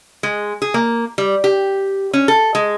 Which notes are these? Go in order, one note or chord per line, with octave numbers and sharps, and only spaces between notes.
G#3
G#4
A#3
G3
G4
C#4
A4
G#3